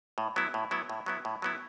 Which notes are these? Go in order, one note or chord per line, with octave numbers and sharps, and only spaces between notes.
A2
F#3 B3 E4
A2
F#3 B3 E4
A2
F#3 B3 E4
A2
F#3 B3 E4